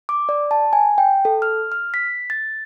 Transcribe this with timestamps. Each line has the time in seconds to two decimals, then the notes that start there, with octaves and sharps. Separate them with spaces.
0.09 D6
0.29 D5
0.51 A5
0.73 G#5
0.98 G5
1.25 A4
1.42 F6
1.72 F6
1.94 B6
2.30 A6